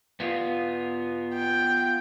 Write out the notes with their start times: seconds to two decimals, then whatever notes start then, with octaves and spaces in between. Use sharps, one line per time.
0.20 B3 F4
1.34 G5